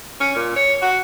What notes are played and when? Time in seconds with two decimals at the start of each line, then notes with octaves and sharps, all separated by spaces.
0.20 C#4
0.36 A#2
0.56 C#5
0.82 F#4